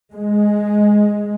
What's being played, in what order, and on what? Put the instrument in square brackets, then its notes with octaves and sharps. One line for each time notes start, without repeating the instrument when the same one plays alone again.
[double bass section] G#3